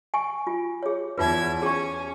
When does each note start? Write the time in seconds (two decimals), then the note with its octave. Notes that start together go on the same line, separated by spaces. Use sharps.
0.14 G#5 C#6
0.47 F4
0.83 G#4 C#5
1.18 E2 D#4 F4 B4 E5 G#6
1.62 C#4 G#4 C#6